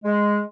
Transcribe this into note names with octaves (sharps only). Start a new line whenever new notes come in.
G#3